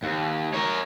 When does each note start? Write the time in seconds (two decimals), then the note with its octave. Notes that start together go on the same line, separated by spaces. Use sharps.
0.04 D#2
0.54 A#4 C#5